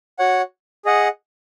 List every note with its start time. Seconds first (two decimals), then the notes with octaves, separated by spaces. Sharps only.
0.19 F#4 C#5 F#5
0.85 G#4 D#5 F#5